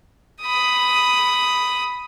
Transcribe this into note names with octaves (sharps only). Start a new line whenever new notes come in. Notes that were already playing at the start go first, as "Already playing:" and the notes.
B5 D#6